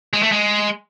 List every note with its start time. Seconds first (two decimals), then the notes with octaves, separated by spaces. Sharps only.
0.13 G#3
0.23 A3
0.32 G#3